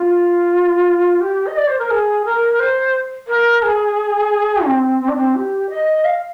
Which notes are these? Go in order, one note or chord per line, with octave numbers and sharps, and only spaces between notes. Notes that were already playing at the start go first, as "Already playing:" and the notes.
Already playing: F4
G4
D#5
D5
C5
A#4
G#4
A#4
C5
A#4
G#4
C4
C4
D4
C4
G4
D#5
F5